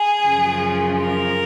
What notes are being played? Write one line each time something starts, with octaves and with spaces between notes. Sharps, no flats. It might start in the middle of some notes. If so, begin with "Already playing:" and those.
Already playing: G#4
F#2 C#3 F3
A#4